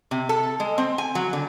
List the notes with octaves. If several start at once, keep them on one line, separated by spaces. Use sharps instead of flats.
C3
A4
G#3
C4
G#5
F#3
D3